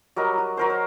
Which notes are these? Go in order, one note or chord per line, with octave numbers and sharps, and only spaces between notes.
F#3 G3 A#4 D#5
F#4
F#3 A#4 C5
C5